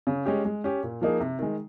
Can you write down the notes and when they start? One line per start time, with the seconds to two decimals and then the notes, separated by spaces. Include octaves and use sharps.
0.07 C#3
0.26 G#3 C#4 G4
0.45 G#3
0.64 C#4 G4
0.83 A#2
1.01 F3 A#3 D#4 G#4
1.20 C3
1.39 D#3 G#3